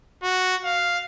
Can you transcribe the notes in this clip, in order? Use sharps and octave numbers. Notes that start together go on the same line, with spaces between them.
F#4
F5